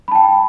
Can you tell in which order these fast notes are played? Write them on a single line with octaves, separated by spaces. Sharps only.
B5 A5 G5